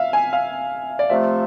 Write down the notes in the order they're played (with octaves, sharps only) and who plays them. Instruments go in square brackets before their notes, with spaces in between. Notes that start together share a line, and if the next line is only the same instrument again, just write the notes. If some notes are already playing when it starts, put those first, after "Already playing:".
Already playing: [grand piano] E5 F5
G#5
F5
D5
[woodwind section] C3 F3 A3 [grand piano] E5